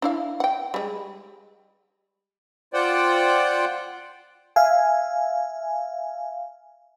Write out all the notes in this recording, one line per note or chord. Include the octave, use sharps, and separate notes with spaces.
D4 E4 F5
F#5 G5
G3 G#3
F4 C5 D5 F#5 G5
E5 F5 G#5